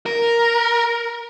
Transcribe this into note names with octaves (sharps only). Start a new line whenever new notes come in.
A#4